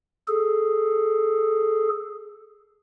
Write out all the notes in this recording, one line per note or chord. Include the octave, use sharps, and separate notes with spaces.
G#4 A4